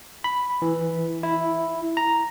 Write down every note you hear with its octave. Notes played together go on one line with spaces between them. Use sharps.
B5
E3
E4
A#5